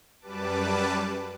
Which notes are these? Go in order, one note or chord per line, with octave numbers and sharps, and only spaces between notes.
F#2 G3 B4 A5 D6